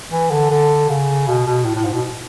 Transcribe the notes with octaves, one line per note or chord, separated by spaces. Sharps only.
E3
D3
D3
C#3
B2
B2
A2
A2
G#2
B2